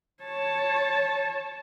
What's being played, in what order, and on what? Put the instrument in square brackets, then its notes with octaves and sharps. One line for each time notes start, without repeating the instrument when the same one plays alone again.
[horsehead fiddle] C#5 A5